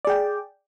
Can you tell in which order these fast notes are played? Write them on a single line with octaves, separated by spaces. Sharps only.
D5 G#4 G5